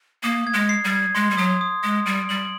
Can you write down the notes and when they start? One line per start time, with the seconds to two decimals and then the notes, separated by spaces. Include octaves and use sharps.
0.23 A#3 D#6
0.47 G#6
0.54 G#3
0.69 C7
0.84 G3
0.92 G#6
1.15 G#3 C6
1.31 G3
1.37 F#3 D#6
1.61 D#6
1.84 G#3 D#6
2.06 G3 D7
2.29 G3 F#7